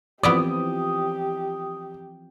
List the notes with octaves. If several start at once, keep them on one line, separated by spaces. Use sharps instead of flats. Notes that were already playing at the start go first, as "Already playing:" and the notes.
E3 F3 B3 C4 E4 G4 D5 D#6